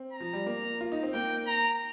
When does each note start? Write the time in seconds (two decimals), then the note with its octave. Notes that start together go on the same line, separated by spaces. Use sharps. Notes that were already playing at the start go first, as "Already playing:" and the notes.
Already playing: C4
0.13 A#5
0.20 F3
0.33 G3
0.46 A#3
0.81 F4
0.92 D#4
1.03 C4
1.13 A#3 G5
1.47 A#5